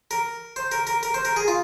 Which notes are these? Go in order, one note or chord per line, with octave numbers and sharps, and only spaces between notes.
A#4
C5
A#4
A#4
A#4
C5
A#4
G#4
F4